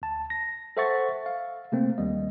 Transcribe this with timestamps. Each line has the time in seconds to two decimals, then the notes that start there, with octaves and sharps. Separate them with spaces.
0.02 D2 A5
0.30 A#6
0.77 A4 C5 E5 F#5 C#6 A6
1.26 F5
1.72 C3 A3 A#3 C4
1.98 D#2 G3 D#5